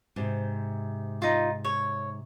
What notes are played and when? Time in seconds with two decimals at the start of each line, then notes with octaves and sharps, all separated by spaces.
0.16 G#2 C3
1.22 D#4 F4
1.65 C#5